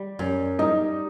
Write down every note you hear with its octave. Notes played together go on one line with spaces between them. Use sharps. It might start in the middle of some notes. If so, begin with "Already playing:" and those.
Already playing: G3
F#2
G3 D#4